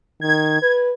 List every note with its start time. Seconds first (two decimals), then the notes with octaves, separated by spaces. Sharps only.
0.21 D#3 G#6
0.62 B4